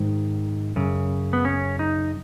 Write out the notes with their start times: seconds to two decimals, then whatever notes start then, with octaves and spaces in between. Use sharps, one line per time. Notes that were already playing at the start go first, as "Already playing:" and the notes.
Already playing: G#2 D#3
0.76 F#2 C#3
1.33 B3
1.45 C#4
1.79 D#4